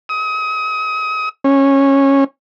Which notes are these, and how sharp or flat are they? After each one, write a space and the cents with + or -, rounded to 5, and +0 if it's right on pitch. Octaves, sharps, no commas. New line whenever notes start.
D#6 +30
C#4 -15